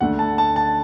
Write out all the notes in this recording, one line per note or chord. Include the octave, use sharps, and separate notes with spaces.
D2 D3 A3 F#5
A5
A5
A5